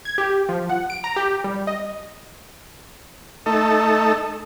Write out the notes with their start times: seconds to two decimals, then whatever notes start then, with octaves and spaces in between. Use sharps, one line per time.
0.05 G#6
0.18 G4
0.49 F3
0.70 F#5
0.90 D7
1.04 A#5
1.16 G4
1.44 G3
1.67 D#5
3.46 A3 D#4 A4